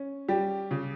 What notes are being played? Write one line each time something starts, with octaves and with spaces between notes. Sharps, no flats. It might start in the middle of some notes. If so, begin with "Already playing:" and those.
Already playing: C#4
G3 G4
C#3